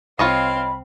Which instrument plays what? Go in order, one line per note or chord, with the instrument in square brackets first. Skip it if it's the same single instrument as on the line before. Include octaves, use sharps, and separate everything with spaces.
[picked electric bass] C2 [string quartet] C4 F5 [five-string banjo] F4 C#5 D#5 [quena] B5